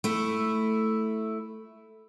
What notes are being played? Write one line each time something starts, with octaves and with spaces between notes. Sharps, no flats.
A3 E4